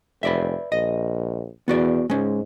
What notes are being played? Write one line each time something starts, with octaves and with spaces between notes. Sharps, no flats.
F1 B4 D5 E5
A#1 D#5
E2 B3 F#4 D5
G#2 G#3 C#4